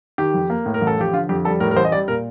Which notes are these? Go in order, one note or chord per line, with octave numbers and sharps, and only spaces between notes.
D#3 G4
F2
A#3
A2
A#4
A1
A4
F3 G4
D3 F4
F2 G4
G3 A4
A2 A#4
A#4
A1 C5
D#5
G3 D5
A#2 A#4